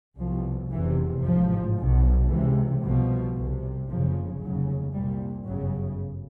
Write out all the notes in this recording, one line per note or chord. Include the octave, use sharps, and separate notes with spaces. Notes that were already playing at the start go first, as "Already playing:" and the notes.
C2 B2 F3
F1 E2 C3 E3
A1 G#2 F3
B1 B2
C#2 C3 E3
C2 B2 F3
C2 C3
F#1 E2 C#3 F3
F1 D#2 C#3 F#3
C2 A#2 G3
G1 F#2 C#3 F#3